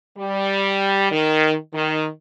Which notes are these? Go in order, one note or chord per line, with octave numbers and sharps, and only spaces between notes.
G3
D#3
D#3